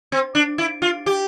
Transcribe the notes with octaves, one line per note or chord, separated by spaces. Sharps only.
C4
D4
E4
F4
G4